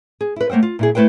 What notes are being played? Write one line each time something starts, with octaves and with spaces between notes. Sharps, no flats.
G#4
E4 B4
A3 A#3 C5 F#5 G5
F4
A#2 E4 G#4
A3 E4 B4 C5 G5